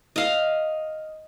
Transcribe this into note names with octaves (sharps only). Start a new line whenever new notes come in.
D#5 F5